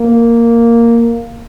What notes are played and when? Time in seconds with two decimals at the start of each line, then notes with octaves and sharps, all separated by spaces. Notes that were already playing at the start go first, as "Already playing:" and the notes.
Already playing: A#3